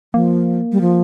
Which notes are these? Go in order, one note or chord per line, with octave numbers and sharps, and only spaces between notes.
F3 A#3
G3
F3